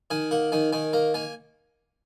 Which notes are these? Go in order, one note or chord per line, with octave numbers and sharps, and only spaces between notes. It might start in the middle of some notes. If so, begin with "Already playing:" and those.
D#3 G#5
A#3 F#5
D#3 G#5
D#3 G#5
A#3 A#5
A#3 G#5